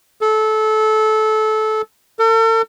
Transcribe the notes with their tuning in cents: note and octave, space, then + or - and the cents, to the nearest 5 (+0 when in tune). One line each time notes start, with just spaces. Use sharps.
A4 -20
A4 +45